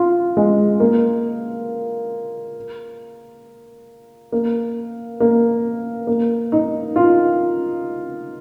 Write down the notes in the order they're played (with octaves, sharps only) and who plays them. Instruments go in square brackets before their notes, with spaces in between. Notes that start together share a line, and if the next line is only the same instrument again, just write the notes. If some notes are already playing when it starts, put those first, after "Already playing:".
Already playing: [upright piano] F4
G#3
A#3
A#3
A#3
A#3
D#4
F4